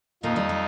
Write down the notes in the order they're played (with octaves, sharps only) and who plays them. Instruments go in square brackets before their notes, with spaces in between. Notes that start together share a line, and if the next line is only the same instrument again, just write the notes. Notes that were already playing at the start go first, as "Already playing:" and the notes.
[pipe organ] F2 F3 D#4 [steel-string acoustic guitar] A#2 A#3
[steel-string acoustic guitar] G3
G3